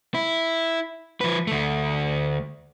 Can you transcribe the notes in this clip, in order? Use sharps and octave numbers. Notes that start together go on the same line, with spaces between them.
E4
F3 B4
D2 A3